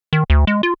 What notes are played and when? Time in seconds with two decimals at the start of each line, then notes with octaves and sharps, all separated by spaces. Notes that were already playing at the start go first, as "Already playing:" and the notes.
0.13 D#3
0.30 D2
0.47 G#3
0.63 F4